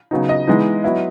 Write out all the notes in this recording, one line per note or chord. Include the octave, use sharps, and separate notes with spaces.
C#3 F#3 B3 D#4
D#5
E3 G#3 B3 D#4
F#3 B3 E4